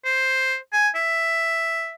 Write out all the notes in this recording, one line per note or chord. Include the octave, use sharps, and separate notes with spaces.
C5
G#5
E5